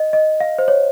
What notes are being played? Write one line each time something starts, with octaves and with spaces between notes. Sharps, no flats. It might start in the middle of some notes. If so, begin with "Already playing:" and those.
Already playing: D#5
D#5
F5
C5
C#5